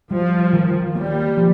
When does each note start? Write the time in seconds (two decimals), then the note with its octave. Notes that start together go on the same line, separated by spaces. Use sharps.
0.11 F3 G3
0.53 D#3
0.95 G3 A#3
1.37 F3